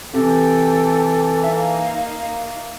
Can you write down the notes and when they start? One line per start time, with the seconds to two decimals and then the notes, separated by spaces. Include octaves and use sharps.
0.14 C3 E3 A4 G5
1.44 A#3 D#4 E5 F5